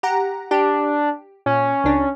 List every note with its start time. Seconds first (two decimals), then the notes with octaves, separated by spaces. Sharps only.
0.03 G4 F#5 A#5
0.51 D4 G4
1.46 A#2 C#4
1.84 C#2 D4